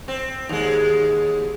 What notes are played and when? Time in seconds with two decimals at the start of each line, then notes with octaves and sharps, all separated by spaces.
0.08 C4
0.49 D#2 G#3